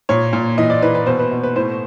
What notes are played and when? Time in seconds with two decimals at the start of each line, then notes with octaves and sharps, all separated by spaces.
0.09 A#2 C#5
0.33 A#2
0.58 E3 D#5
0.70 D5
0.82 E3 B4
0.95 B4
1.06 B2 C5
1.19 B4
1.31 B2
1.43 B4
1.56 A2 C5